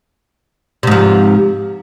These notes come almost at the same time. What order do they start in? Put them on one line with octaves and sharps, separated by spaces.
C3 G#2 F3